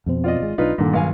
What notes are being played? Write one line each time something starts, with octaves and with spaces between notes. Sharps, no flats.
F2 B2 C4
F4 D5 D#5
G#1 G#3
B1 D4 D#4 F4 B4
G2 A#2 D3 D#3
B1 F5 G#5